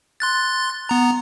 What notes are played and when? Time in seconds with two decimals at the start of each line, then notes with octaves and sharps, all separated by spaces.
0.20 C6 F#6 A6
0.89 B3 A#5